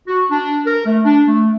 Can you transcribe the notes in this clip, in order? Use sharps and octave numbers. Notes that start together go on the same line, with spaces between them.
F#4
D4
A#4
A3
D4
A3